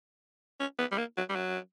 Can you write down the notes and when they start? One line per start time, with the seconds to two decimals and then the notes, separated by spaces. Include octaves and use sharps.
0.60 C#4
0.79 B3
0.92 G3
0.98 A#3
1.17 F#3
1.29 G3
1.35 F#3